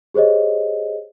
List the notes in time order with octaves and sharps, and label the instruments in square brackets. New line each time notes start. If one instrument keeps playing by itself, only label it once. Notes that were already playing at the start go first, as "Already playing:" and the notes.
[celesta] G4 G#4 C5 C#5 D#5